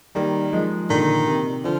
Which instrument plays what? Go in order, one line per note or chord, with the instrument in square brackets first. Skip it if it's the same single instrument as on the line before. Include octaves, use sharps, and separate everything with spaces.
[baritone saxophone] D#3 [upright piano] G3 A#3
[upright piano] F3 G#3
[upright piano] A#2 D3 [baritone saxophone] D#3
[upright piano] C3
[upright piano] D3 [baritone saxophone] F3